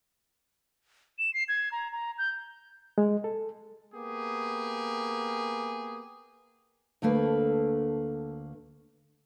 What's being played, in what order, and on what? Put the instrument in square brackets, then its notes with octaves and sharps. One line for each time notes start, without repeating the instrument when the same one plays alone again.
[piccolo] E7
C7
G#6
A#5
A#5
G6
[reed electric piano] G#3
A4
[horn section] A#3 B3 G4 G#4
[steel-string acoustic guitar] D2 D3 A3 A#3 B4